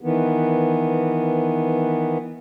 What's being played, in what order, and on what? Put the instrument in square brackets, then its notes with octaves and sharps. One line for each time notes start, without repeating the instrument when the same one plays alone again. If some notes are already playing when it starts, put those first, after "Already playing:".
[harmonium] D#3 E3 B3